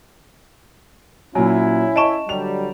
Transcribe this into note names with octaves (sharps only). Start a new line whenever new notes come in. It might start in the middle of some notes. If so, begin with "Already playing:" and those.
A#2 F#3 C#4 E4 G#5
D#5 A5 C#6 D7 E7
D3 F#3 G3 F7